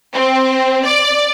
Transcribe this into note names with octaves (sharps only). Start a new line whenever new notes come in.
C4
D5